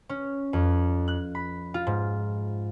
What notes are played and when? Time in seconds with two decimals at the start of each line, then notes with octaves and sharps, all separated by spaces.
0.09 C#4
0.53 F2
1.08 F#6
1.35 B5
1.74 F4
1.87 G#2